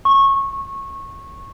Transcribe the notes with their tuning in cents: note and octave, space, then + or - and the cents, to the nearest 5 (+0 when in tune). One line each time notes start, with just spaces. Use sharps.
C#6 -20